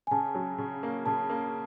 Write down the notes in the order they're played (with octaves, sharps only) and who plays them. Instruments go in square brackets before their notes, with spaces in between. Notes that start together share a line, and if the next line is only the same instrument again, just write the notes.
[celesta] G#5
[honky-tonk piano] C#3 [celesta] A5
[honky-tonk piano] F#3
C#3
A#3
[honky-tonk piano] C#3 [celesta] A5
[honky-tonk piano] A#3